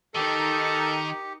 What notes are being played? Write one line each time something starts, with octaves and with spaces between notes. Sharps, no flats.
D#3 D#4 G4 A4 A#4 C#7